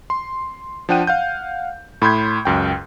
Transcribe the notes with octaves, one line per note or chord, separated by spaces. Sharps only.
C6
F3 D4 F#5 G5 D#7
F5 F#5 G6
A2 B5 C6 G6 G#6
C#2 F#2 G5